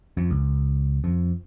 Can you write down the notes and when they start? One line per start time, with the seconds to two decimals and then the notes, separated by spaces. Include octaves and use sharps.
0.17 F2
0.31 C#2
1.04 F2